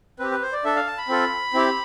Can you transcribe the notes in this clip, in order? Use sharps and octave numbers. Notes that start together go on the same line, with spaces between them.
C4 G4 B4
B4
C5
D5
D4 A4 E5
F5
A5
B5
C4 F4 A4
C4 E4 G4